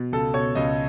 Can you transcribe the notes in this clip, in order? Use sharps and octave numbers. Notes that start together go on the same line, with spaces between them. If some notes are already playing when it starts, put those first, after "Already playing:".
Already playing: B2
C#2 A4
B2 C#5
C#2 D#5